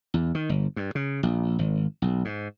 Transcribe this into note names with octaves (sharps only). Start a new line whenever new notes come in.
E2
D#3
G1
G2
C#3
A#1
G#1
B1
G#2